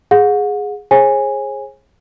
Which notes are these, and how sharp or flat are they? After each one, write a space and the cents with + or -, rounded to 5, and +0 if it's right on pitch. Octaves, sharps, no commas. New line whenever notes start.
G#4 -5 F#5 -35
G#4 +0 C#5 -45 G#5 -10